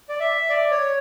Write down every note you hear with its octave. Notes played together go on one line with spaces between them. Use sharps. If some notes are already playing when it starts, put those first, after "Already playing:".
D5
E5
D5
C#5